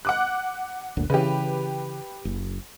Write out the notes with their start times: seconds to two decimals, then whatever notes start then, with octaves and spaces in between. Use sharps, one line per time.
0.05 F#5 D6 F#6
0.97 G1 D2 A#2
1.10 C#3 E3 G4 B4
2.25 F#1